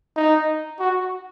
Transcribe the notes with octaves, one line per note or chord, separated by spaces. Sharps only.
D#4
F#4